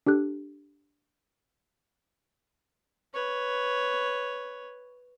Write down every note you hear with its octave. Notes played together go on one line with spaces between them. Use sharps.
D4 G4 A4 F#6
B4 C#5